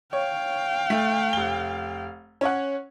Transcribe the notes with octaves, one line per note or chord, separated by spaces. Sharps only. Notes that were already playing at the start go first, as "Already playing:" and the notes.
C#5 F5 G5
A3
F1 G7
C#4 C#5 F#5